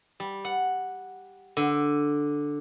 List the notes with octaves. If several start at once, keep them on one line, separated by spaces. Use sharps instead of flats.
G3
F#5
D3